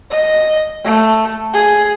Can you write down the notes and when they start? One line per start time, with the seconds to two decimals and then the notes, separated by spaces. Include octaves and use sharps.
0.11 D#5
0.84 A3
1.53 G#4